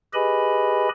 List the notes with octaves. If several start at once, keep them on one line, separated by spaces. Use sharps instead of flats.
G4 G#4 B4 D#5 G#5 B5